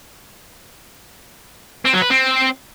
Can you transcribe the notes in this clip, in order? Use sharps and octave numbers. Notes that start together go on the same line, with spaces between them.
C4
F#3
B4
C4